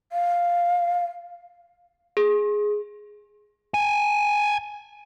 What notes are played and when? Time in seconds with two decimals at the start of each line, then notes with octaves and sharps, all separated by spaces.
0.12 F5
2.17 G#4
3.74 G5 G#5